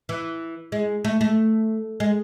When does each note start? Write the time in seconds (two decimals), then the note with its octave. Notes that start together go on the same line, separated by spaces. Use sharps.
0.09 E3
0.72 G#3
1.05 A3
1.21 A3
2.00 G#3